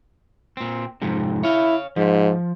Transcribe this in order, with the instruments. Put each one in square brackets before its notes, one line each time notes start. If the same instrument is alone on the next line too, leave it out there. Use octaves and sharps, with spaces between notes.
[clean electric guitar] A#2 C4
F2 G#2 C3
[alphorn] E4 [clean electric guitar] C#5 F5
[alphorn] G#2 [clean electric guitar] F3